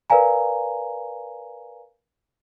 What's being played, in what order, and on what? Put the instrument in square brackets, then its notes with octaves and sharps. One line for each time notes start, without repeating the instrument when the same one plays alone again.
[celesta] A#4 B4 D5 F5 G#5 A#5